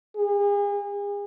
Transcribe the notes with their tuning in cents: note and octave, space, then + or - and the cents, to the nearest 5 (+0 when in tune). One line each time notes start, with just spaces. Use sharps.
G#4 -40